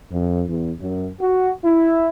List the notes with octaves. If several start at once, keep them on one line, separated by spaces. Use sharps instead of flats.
F2
E2
F#2
F#4
E4